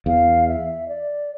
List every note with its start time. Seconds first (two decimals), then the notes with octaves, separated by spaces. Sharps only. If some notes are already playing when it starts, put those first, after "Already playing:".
0.06 E2 F5
0.48 E5
0.88 D5